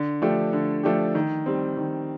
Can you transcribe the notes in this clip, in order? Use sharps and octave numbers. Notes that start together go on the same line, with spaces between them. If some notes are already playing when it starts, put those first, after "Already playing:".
Already playing: D3
F3 A3 D4 G4
D3
F3 A3 D4 G4
D#3
G3 C4
D#3